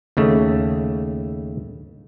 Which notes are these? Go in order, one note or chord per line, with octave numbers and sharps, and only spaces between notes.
D#2 C#3 A3